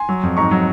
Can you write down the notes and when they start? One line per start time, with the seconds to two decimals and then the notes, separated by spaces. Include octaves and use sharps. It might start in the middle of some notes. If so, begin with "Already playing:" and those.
Already playing: G#5 C6
0.09 F#3
0.23 F2
0.37 G#2 A#5 C#6
0.51 F#3